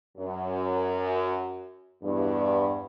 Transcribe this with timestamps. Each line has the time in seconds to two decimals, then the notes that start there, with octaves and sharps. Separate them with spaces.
0.18 F#2
2.03 E2 G2